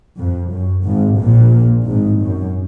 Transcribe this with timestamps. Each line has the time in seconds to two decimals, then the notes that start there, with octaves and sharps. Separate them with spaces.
0.16 F2
0.50 F#2
0.84 G#1 G#2
1.18 A#1 A#2
1.86 G#1 G#2
2.19 F#2